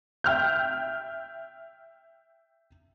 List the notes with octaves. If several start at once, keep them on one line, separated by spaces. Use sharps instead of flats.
E5 G5 F6 G6